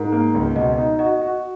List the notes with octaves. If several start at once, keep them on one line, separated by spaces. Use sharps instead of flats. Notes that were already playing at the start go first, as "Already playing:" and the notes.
Already playing: G#2 A#4
A#3
C#2
B2 D#5
D#4
F#4 D#5
F#4